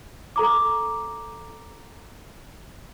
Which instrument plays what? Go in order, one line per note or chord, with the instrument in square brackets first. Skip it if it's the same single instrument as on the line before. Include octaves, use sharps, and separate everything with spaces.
[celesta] A4 A#5 D6